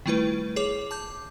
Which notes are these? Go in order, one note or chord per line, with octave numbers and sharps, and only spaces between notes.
D#3 G3 A3 E4 F4 B4
G#4 C#5 D6
A5 D6 G6